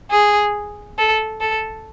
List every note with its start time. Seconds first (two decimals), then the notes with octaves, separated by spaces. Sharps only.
0.11 G#4
0.98 A4
1.41 A4